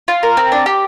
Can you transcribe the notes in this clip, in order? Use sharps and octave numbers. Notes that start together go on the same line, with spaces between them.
F4
A#4
C4
D4
G4